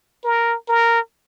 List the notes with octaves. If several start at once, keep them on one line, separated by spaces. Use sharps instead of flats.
A#4
A#4